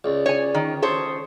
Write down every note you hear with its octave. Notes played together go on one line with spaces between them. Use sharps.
C#2 D5
C#5 G#5
D#3
A4 C5 C#5 D#6